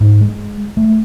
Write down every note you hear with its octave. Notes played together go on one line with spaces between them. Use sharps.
G#2
G#3
A3